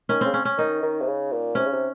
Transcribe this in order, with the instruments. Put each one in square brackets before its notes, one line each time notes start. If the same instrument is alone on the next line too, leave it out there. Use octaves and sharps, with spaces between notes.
[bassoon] D#3 [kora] C#4
[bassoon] C#3 [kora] C4
[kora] C#4
C#4
[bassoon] D#3 [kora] D#4
[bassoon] D#3
C3
C#3
A#2
[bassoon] C3 [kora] C#4
[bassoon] C#3
C3